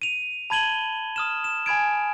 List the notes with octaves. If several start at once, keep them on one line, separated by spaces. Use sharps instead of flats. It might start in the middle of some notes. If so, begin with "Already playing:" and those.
D#7 F7
A5 B5 G#6 D#7 F#7 G7
D#6 F6 E7
E7
G#5 B5 G#6 D7